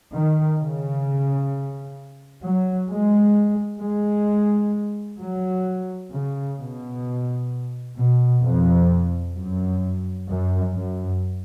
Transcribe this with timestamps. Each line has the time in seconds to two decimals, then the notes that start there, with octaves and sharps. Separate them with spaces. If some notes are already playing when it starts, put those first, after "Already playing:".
0.12 D#3
0.58 C#3
2.43 F#3
2.89 G#3
3.81 G#3
5.19 F#3
6.12 C#3
6.58 B2
7.97 B2
8.43 F2
9.35 F#2
10.27 F#2
10.74 F#2